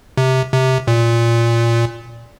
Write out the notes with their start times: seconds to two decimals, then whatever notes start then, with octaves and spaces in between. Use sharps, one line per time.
0.17 C3
0.53 C3
0.87 A#2